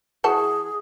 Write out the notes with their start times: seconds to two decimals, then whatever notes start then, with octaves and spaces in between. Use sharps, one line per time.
0.24 E3 F#4 G#4 A5